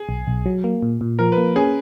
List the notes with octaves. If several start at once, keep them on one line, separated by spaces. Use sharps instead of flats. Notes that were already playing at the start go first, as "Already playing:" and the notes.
Already playing: G#4
B1
B1
F#3
A#3
A#2
A#2
F3 A#4
B4
A#3
C#4 G#4